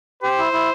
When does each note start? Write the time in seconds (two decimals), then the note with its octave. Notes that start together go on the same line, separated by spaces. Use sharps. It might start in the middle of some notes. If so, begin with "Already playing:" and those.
0.23 G4 C5
0.38 E4
0.53 E4